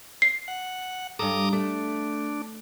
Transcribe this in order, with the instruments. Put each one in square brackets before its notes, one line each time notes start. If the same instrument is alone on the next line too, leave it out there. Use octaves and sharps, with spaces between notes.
[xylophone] C7
[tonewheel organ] F#5
[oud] G2 A4 [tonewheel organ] A#5 D6 D#6
[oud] A3 [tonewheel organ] D4